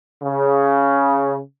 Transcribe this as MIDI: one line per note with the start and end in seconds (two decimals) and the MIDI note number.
0.23 1.37 49